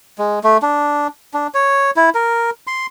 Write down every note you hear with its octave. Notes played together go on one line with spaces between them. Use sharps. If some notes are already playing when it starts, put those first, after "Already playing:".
G#3
A3
D4
D4
C#5
E4
A#4
C6